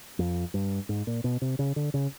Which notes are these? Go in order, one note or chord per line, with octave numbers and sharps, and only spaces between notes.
F2
G2
G#2
A#2
B2
C3
C#3
D3
C#3